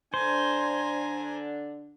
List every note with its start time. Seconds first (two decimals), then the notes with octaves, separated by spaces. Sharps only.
0.14 D3 D4 C5 G#5 A#5